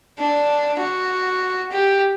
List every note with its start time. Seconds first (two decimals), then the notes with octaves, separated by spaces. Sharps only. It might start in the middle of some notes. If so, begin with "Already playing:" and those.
0.19 D4
0.79 F#4
1.72 G4